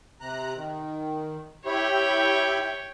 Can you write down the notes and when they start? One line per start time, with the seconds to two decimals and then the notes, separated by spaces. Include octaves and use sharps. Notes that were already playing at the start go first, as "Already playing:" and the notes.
0.21 C3 A#5 F#6
0.56 D#3
1.66 E4 G4 C#5 G5 B5